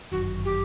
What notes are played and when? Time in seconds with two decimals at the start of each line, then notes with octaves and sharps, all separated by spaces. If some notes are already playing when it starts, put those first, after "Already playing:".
0.12 G1 F#2 D#3 F#4
0.45 G4